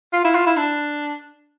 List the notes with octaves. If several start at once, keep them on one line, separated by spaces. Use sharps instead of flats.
F4
E4
F4
E4
D4